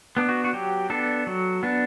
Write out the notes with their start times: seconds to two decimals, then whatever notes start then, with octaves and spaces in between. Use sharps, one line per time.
0.17 B3 D4
0.29 F#4
0.44 F#4
0.53 F#3 G4
0.90 B3 D4 A4
1.27 F#3
1.63 B3 D4